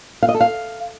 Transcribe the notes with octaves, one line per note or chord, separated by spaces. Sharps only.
F5
D#5
A4
F5